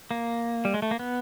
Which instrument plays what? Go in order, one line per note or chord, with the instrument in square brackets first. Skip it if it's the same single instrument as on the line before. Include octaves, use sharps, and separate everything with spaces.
[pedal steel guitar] A#3
G3
G#3
A3
A#3
B3